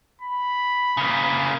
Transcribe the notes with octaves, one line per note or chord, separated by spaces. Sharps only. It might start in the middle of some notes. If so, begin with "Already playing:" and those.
B5
C#3 A#3